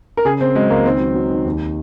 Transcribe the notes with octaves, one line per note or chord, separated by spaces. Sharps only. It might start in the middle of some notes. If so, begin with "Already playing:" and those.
A#4
C#3 G#4
C#3 C4
F#3 G#3
C#2 A#3
D#3 C4
F#3
F#3
D#3
D#2